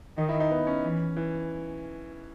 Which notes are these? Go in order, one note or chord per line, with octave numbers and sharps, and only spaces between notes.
D#3 D#4
E4
D#4
B3
C#4
E3
E3